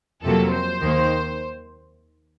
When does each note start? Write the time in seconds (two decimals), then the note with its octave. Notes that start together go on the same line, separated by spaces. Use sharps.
0.23 F2 C3 F#3 A#3 A4
0.52 C5
0.81 D#2 D#3 A#3